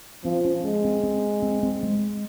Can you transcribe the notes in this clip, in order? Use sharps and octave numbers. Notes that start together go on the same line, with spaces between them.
F3 C4
C#4
G#3 C#4
C4
C4
C4
C4
G#3